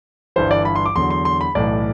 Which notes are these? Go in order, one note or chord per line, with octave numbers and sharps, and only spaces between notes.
G1 G2 E3 C5
D5
B5
C6
D6
E2 D3 F#3 C6
C6
C6
B5
B1 A2 E3 D5